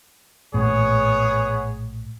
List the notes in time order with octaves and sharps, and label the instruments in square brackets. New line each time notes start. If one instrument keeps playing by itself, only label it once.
[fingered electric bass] A#1 A2 [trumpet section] B3 G#4 C#5